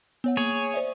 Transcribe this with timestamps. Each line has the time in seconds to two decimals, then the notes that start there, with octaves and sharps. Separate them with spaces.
0.24 B3 C#5 F#5
0.37 A#3 G#4 C#5
0.74 C5 D5 E5